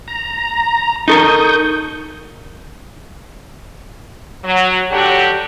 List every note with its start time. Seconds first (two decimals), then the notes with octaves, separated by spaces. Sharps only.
0.08 A#5
1.08 D#4 A4 A#4 C#6 D#6 G6
4.45 F#3
4.92 D3 F#3 D4 F#4 G4